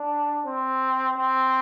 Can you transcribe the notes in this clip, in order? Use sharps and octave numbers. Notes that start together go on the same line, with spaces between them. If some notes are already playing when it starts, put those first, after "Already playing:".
Already playing: D4
C4
C4